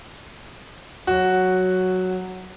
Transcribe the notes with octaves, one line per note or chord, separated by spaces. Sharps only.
F#3 F#4